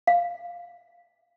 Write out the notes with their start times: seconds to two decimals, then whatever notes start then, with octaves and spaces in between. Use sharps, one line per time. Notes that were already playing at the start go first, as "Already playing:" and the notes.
0.07 F5